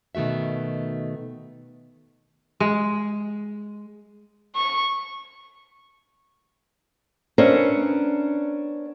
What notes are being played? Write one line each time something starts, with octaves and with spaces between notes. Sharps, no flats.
B2 D#3 A3 F#4 E5
G#3
C#6
B3 C#4 D4 A#4 C5 E5